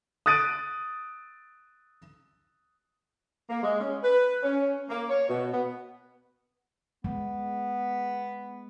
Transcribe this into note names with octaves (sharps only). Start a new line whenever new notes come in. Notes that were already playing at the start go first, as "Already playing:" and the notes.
D#6 F#6 A6 D7 D#7
A#3
G#3
C#4
B4
C#4
A#3
C#5
B2
B3
G#3 B3